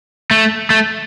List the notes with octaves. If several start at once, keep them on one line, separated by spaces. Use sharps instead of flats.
A3
A3